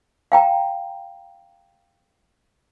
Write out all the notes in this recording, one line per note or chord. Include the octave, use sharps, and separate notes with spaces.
F5 G5 A#5